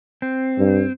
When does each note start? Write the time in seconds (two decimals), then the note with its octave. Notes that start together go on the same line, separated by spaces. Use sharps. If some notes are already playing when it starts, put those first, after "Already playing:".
0.22 C4
0.58 G2